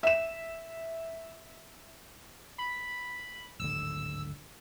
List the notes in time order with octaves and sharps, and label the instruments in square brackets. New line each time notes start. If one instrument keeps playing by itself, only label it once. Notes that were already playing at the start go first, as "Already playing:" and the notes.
[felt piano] E5 E7
[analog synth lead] B5
[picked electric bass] D1 G#1 D3 [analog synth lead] E6